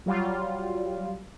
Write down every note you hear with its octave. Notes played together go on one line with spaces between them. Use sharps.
F#3 G3 F4